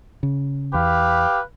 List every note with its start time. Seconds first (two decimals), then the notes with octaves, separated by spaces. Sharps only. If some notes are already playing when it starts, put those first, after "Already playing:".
0.23 C#3
0.74 E2 G4 B4 F5